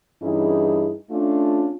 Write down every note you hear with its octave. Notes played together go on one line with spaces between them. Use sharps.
G2 E3 C#4 D#4 E4 G#4
A3 C#4 D4 F4